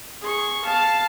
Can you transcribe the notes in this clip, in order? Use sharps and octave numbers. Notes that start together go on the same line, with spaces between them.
G#4 C#6
F5 A5